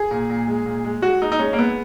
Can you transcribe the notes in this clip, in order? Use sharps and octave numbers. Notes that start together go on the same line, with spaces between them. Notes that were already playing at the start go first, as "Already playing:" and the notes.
Already playing: G#4
A#2
A#2
G#3
A#2
G#3
G#3 F#4
G#3 D#4
D#4
G#3 C#4
A#3
G#3 B3